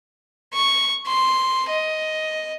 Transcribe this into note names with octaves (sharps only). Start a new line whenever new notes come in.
C#6
C6
D#5